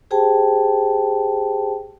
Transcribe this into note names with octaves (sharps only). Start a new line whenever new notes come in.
G4 G#4 C5 G5 A5